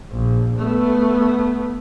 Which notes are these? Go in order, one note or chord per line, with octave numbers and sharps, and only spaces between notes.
A#1
A3 B3